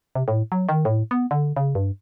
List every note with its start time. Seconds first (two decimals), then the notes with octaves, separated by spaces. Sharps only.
0.15 C3
0.28 A2
0.52 F#3
0.69 D#3
0.85 A2
1.11 B3
1.31 D3
1.57 C#3
1.75 G2